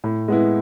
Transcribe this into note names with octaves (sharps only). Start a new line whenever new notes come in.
A2
G#3 B3 E4